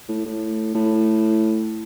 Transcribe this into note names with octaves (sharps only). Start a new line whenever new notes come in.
A2
A2
A2